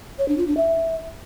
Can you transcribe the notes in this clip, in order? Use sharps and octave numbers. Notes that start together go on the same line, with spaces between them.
C#5
D4
F4
D4
E5